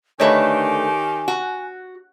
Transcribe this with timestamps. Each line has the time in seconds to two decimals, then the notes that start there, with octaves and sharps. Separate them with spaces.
0.20 D3 D#3 A3 G4 B4 C#5 D#5 G#5
1.28 F#4